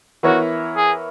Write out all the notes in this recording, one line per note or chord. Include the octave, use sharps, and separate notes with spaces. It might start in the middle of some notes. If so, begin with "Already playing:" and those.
E3 B3 E4 F#4 A#4 C#5
G#4